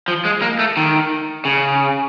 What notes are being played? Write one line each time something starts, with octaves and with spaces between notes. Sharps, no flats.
F3
G#3
A#3
A3
D#3
C#3